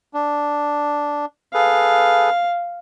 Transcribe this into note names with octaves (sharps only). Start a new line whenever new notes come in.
D4
G#4 A4 B4 F5